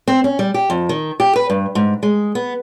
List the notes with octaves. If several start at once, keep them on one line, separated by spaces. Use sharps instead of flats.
C4
C#4
G3
G4
F2
D#3
G4
B4
G2
G#2
G#3
B3